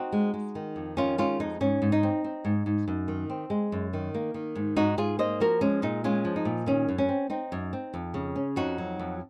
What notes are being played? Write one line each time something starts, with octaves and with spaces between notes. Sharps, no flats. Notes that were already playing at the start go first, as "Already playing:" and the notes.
Already playing: C4 D#4 F#4
G#3
G#3
D#3
F2
D#3 C#4 F4
G#3 C#4 F4
F2 D#4
G#2 C#4
G#2
D#4
C4
C4
G#2
G#2
F#2
D#3
C4
G#3
F#2
D#3
A#3
D#3
G#2
G#2 D#4 F#4
G#2 F4 G#4
A#3 C5 D#5
F3 F#4 A#4
G#3 C#4
A#2 D#4
G#3 C#4 F4
F3
D#4
A#2
D#3 C#4
F#2
C#4
C4
C4 D#4
F#2
C4
F2
C#3
C#4
F2 D#4 F#4
F#3
F2